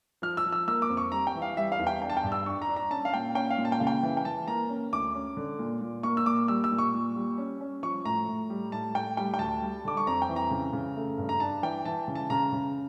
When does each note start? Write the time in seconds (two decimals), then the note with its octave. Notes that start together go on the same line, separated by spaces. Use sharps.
0.22 F3 F6
0.37 E6
0.45 F3
0.52 E6
0.67 A#3 E6
0.82 D6
0.90 F2
0.97 C#6
1.12 G3 A#5
1.27 G5
1.35 E3
1.42 F5
1.57 G3 E5
1.72 F5
1.79 E2
1.87 G5
2.02 D4 G5
2.10 A5
2.17 G5
2.23 G2
2.32 E6
2.46 D4 C#6
2.62 A#5
2.69 D4
2.76 A#5
2.91 C#4 A5
3.05 F5
3.14 A#2 G5
3.35 C#4 G5
3.50 F5
3.58 A#2
3.65 A5
3.72 G5
3.80 C#3 F5
3.87 G5
4.03 E3
4.17 G5
4.25 E3 A5
4.47 A#3 A#5
4.69 C#4
4.92 D2 D6
5.15 C#4
5.37 D3
5.59 A#2
5.81 A#2
6.03 A#3 C#6
6.17 E6
6.26 A#2 D6
6.48 G3 E6
6.64 E6
6.71 A#2
6.78 C#6
6.94 A#2
7.16 G3
7.38 C#4
7.61 C#4
7.83 F3 C#6
8.05 A2 A#5
8.28 A2
8.50 G3
8.72 A2 A5
8.95 A2 G5
9.17 G3 G5
9.34 G5
9.39 D2 A5
9.62 G3
9.85 D3 D6
9.97 C#6
10.07 F2 A#5
10.22 G5
10.29 E3
10.36 A#5
10.51 C#3
10.73 C#3
10.96 A3
11.18 G2
11.29 A#5
11.40 D4 A5
11.63 E3 G5
11.85 E3 A5
12.08 C#3
12.15 A5
12.30 C#3 A#5
12.52 C#3